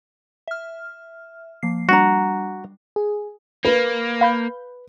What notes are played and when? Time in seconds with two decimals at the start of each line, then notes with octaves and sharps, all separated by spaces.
0.48 E5 F6
1.63 F3 A#3 C7
1.89 G3 D4 F#4 F#5 A#5
2.96 G#4
3.65 A#3 B4
4.21 F5 B5 G6